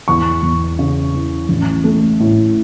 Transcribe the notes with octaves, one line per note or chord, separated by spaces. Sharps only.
E2 C#6
E2
C#3
E3
A1
A3
A2